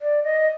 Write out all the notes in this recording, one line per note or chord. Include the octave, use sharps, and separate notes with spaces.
D5
D#5